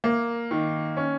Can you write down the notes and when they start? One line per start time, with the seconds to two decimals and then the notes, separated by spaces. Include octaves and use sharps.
0.04 A#3
0.51 D#3
0.97 C#4